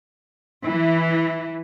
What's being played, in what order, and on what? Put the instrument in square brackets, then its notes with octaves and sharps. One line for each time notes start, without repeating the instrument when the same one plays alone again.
[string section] E3